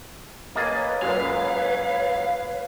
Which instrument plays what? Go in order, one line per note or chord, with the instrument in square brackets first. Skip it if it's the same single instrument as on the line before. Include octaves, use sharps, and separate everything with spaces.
[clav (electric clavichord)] A#3 G#4 [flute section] B4 C#5 [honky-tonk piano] D#5 A6 D#7
[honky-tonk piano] F#2 F#4 [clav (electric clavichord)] A#2 G#3 [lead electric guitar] F5